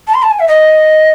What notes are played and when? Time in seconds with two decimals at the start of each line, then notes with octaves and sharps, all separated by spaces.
0.07 A5
0.14 C6
0.22 A5
0.31 G#5
0.40 E5
0.48 D#5